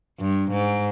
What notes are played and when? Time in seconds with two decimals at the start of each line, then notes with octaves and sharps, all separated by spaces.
0.20 G2
0.50 G#2